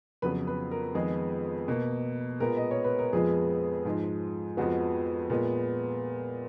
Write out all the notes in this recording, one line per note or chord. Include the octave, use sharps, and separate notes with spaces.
F2 C#3 F#3 B3 B4
B4
A#4
F2 D#3 G#3 B3 G#4
B2 A#3
A#2 G#3 B3 A#4
D#5
C#5
B4
A#4
F2 F3 G#3 B3 G#4
G#2 F3 G#3
F2 F3 G#3 B3 F#4
A#2 G#3 B3